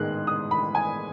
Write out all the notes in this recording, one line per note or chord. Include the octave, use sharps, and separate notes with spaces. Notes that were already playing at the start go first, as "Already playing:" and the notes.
Already playing: A1 G#2 D#3 G#3 B3 F#6
D#6
B5
G#5